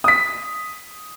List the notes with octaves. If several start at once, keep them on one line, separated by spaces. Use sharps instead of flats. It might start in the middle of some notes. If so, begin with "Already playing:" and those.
D#6 B6